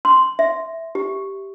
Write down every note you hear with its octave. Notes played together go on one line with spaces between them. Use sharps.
C6
E5
G4